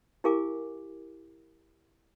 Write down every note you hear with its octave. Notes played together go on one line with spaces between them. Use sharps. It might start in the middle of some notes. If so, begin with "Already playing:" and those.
E4 G4 A#4 F5 G#5 D6